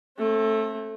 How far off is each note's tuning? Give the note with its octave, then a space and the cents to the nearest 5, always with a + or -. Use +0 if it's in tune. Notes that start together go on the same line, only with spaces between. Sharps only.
A3 +0 C4 +45